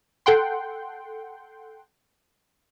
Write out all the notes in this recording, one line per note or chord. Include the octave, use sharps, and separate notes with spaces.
A4 F#5 G5 C6